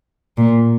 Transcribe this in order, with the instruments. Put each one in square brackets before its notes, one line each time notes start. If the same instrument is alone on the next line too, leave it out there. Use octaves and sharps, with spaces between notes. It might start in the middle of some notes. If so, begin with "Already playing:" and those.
[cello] A#2